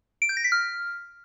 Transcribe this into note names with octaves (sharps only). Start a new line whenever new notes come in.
D7
G6
A#6
B6
F6